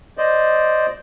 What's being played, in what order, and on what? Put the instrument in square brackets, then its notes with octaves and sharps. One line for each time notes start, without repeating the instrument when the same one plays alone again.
[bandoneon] C5 D5 D#5